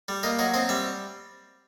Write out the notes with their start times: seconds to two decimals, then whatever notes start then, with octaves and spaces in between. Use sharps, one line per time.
0.08 G3
0.23 A#3 D#5
0.39 F#3 D#5
0.54 C4 D#5
0.69 G3 E5